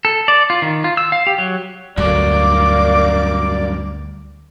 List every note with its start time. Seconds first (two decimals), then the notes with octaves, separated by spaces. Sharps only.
0.05 A4
0.28 D5
0.50 F4
0.62 D#3
0.84 F4
0.97 E6
1.12 F5
1.27 G4
1.38 F#3
1.97 D2 G2 F#3 A#3 D5 D6